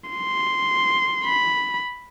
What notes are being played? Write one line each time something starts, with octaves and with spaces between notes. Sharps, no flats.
C6
B5